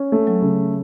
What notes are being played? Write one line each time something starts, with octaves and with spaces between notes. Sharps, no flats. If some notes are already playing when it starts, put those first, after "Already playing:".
Already playing: C#4
A3
F#3
C#3